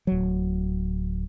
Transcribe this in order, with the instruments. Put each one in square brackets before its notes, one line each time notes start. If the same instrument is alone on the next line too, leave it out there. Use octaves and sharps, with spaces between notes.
[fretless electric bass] D1 F#3